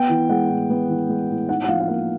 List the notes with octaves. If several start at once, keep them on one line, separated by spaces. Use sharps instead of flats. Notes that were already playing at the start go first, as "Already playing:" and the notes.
Already playing: B3 G5
E3
G#3 F#5
A2
B3
E3
G#3
A2
D#4 F#5
F#5
F3 F5
F#5
A#3 F5